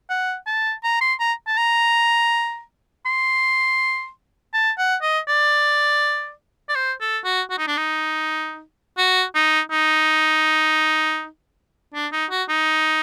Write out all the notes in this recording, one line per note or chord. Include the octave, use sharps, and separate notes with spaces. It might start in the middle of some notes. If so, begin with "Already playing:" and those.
F#5
A5
A#5
C6
A#5
A5
A#5
C6
A5
F#5
D#5
D5
D5
C5
A4
F#4
F#4
D#4
D4
D#4
F#4
D#4
D#4
D4
D#4
F#4
D#4